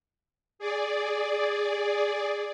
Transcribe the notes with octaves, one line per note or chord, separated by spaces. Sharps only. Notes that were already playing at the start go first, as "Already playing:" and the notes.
G#4 D5